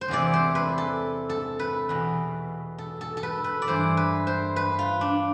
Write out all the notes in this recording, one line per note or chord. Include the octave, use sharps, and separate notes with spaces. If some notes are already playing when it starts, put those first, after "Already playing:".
C5
E2 C3 E3 D5
C5
B4
A4
A4
B4
E2 B2
A4
A4
A4
B4
B4
D5
G2 E3 C5
B4
C5
B4
F4
D4